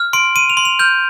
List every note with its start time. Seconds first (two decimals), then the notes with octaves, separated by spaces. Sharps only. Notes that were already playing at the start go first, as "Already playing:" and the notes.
Already playing: F6
0.13 C6 D7
0.36 C6 D#7
0.50 F7
0.57 C6
0.65 F7
0.79 F6 G6